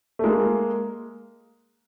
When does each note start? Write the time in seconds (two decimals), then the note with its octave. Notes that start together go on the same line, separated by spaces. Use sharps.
0.19 A3
0.23 G#3 A#3